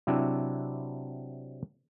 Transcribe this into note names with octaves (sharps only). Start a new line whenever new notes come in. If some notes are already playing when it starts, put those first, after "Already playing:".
C3 F#3 C4 D4 E4